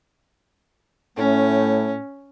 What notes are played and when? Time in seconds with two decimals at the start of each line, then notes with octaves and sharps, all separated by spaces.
1.16 A2 A3 C#4